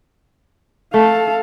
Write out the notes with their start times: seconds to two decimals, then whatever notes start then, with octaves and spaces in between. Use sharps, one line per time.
0.94 A3 A4 F5